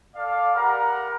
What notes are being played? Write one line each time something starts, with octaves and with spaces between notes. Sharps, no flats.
A4 D5 F5
G4 A#4 F#5 A#5 B5